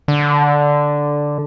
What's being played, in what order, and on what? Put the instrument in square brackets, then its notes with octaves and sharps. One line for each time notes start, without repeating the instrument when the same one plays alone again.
[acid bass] D3